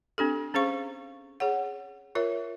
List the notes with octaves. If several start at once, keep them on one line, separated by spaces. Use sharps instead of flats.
C4 D4 G4 A4
C#4 G#4 C5 F5 C#6
G#4 C#5 F#5
F4 A#4 C#5 E5